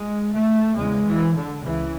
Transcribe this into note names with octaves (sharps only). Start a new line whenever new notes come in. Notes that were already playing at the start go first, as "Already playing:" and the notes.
Already playing: G#3
A3
E2 C#3 G#3
E3
D3
C#2 C#3 E3